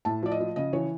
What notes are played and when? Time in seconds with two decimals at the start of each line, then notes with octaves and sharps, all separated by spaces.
0.05 A2 A5
0.23 F3 D5
0.31 D#5
0.40 F3
0.56 C#3 D#5
0.73 E3 C#5